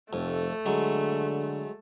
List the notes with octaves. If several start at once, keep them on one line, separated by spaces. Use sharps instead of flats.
F1 F2 A3
D3 F#3 G#3